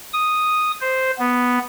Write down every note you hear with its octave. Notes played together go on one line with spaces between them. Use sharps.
D#6
C5
B3